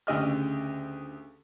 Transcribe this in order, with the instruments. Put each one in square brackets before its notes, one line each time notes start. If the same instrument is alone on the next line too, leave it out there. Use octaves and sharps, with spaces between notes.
[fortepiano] D2 C#3 G4 D#5 E6 F6